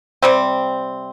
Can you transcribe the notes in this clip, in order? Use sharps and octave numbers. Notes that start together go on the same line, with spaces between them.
C3 G3 C4